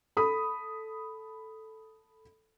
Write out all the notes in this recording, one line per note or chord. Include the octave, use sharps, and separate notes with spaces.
A4 B5 D#6